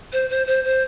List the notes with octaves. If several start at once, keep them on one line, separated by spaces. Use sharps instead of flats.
C5
C5
C5
C5